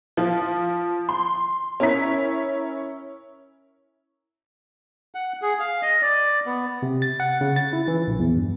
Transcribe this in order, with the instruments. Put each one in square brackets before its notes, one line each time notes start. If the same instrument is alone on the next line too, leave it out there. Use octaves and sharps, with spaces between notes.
[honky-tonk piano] F3 F4
C6
C#4 E4 A#4 C#5 B6
[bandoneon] F#5
G#4
F5
D#5
D5
B3
[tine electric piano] C3
A6
F#5
C#3
A6
E4
E3
A#1
E2
G2